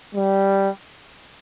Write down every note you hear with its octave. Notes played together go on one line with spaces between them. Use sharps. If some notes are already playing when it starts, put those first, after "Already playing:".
G3